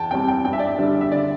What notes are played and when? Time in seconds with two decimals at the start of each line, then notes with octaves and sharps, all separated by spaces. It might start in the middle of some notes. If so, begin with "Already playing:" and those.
Already playing: E2 G5 A5
0.11 C3 G3 C4 G5
0.28 G5
0.45 G2 G5
0.53 E5
0.59 D5
0.67 E5
0.78 D3 G3 D4
1.01 E5
1.12 D3 D5